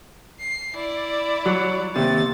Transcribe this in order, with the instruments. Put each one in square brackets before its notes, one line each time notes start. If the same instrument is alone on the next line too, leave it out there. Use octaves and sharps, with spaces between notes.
[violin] C7
E4 D5
[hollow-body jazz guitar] F#3
[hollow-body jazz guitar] D#2 C3 [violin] A6